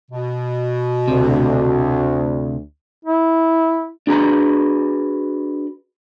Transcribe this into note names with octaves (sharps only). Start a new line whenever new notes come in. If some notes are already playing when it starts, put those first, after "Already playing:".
B2
D2 C3
E4
D4 F#4 G#4 B4 A#5